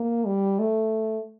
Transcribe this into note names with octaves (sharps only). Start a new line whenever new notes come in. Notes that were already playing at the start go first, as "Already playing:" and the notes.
Already playing: A#3
G3
A3